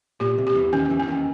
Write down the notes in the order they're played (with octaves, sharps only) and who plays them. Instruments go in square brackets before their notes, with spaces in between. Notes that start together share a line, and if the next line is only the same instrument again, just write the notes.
[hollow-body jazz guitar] A#2 [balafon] G4
[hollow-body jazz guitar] C2 C3
[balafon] G4
[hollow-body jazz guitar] E2 E3
[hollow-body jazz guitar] D#2 D#3 [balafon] C#4
[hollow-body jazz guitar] E2 E3
[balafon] C#4
[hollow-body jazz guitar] D#2 D#3